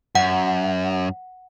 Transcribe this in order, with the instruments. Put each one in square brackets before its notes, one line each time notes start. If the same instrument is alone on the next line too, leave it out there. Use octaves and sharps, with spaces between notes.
[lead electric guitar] F#2 [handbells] F#5